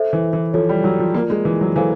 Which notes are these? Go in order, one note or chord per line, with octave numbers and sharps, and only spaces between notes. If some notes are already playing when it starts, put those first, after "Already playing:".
Already playing: A4 C5 E5
E3
E3
F3 F4 A4 C#5
G3
F#3
F3
A#3 F4 A#4 D5
G#3
E3
F#3
E3 A4 C5 F5 G#5